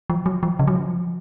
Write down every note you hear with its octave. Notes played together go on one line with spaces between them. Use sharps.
F3
F#3
F3
C#3
F#3
F3